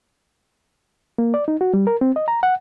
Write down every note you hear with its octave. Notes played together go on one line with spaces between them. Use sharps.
A#3
D5
D#4
F#4
G3
A#4
C4
D#5
A#5
F#5